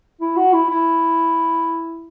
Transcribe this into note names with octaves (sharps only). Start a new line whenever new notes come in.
E4
F#4
E4
E4